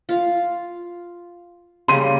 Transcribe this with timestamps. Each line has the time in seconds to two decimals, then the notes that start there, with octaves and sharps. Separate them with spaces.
0.09 F4 F5
1.88 C#3 G3 A#3 C6 D#7